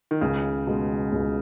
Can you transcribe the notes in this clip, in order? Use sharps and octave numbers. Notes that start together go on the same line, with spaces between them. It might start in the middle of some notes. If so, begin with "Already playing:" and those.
D#3
C#2 C#3
B2 G#3
C#2